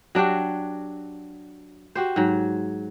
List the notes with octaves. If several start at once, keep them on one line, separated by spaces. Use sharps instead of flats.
F#3 D4 F#4 G4
F#4 G4 C5
G#2 F#3